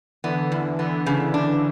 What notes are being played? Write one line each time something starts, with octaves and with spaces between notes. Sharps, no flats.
D3 E3 B3
E2
D3 E3 B3
C#3
D4